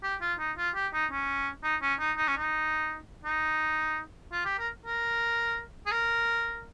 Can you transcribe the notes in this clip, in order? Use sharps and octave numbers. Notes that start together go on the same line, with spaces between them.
G4
F4
D#4
F4
G4
D#4
C#4
D#4
C#4
D#4
D#4
C#4
D#4
D#4
F4
G4
A#4
A#4
G#4
A#4